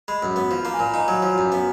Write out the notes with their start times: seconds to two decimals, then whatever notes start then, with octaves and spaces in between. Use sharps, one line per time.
0.08 G#3 B5
0.23 F#2
0.36 B3
0.51 F3
0.65 A#3 A#5
0.74 G#5
0.79 A#2 A#5
0.94 D#4 A#5
1.08 F#3
1.23 F3
1.38 F#2
1.52 B3